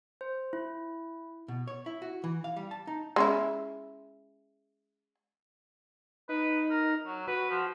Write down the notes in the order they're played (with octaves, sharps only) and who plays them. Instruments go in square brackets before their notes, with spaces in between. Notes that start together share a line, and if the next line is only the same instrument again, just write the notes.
[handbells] C5
E4
[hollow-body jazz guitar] B2
C#5
E4
F#4
E3
F5
G3
A5
D#4
[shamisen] G#3 C#4 E4
[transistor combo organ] D#4 [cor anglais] B4
[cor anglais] A#4
F#3
[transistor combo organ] F#4 [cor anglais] B4
[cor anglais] F3